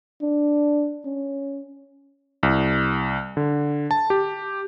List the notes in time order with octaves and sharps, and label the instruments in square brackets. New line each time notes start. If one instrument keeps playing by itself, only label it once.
[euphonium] D4
C#4
[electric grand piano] C2
D3
A5
G4